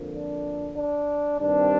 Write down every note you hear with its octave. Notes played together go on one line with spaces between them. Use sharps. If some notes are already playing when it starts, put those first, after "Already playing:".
Already playing: F2 D3 F3 A#3
D4
D4
G2 D#3 G3 C4 D4